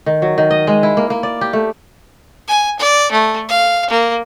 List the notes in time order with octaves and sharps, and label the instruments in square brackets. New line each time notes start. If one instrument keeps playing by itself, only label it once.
[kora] D#3
F#3
D#3
D#5
G#3
E4
A#3
A#3
D5
G4
A3
[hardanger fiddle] G#5
D5
A3
F5
A#3